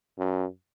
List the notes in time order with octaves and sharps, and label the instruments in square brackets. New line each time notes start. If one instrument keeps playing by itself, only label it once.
[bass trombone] F#2